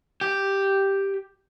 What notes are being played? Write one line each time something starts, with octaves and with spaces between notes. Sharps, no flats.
G4